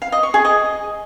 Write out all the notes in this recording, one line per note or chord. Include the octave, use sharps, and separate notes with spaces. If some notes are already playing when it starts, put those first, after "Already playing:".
F5
D#5
C#6
G#4
D#5